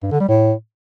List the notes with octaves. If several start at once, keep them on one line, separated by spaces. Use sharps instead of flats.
G2
D3
G3
A2